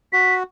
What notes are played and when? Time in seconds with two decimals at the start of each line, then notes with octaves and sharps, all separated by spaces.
0.13 F#4 B6